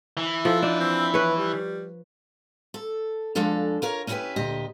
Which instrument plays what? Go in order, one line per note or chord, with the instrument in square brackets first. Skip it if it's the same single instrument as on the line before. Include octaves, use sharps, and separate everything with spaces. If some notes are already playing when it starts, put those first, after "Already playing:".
[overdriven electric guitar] E3
[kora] F3 [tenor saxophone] A4
[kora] D4 [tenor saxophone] D#4
[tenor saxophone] C4
[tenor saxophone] B3 [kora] B4 C#5
[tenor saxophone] G3
[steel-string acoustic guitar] A4
F2 F3 G#3 D4 A4 F5
F4 A#4 C#5
C#4 D#4 E4 F#4 G4 B4
D2 A#2 G4 D#5